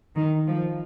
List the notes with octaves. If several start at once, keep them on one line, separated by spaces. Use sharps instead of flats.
D#3
F3